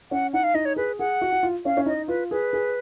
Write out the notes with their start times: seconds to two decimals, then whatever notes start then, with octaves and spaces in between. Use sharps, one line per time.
0.11 C#4 F#5
0.33 D#4 F#5
0.44 F5
0.54 D#4 D#5
0.65 C#5
0.76 G#4 B4
0.99 G#4 F#5
1.21 F#4
1.32 F#4
1.43 F4
1.65 C#4 F5
1.77 C#4
1.86 D#4 D#5
2.08 F4 B4
2.31 G#4 B4
2.53 G#4